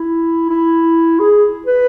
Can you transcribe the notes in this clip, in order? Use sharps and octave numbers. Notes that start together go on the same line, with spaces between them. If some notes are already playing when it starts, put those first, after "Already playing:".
Already playing: E4
E4
G#4
B4